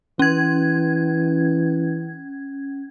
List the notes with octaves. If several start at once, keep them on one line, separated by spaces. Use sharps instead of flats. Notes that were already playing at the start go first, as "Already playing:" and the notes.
E3 C#4 G#6